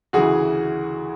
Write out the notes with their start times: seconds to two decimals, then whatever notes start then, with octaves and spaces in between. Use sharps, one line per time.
0.13 D2 C#3 E3 F#4 G#4